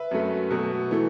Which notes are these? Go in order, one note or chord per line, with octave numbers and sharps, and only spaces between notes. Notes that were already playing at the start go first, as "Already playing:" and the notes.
Already playing: B4 E5
F#2 F#3 A3
B2 F#3 A3
E3 A3